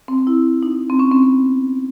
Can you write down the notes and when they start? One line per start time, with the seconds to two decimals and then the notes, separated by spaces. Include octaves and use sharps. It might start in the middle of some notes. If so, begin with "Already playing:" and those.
0.08 C4
0.27 E4
0.63 D#4
0.90 C4
0.99 C#4
1.11 C4
1.23 B3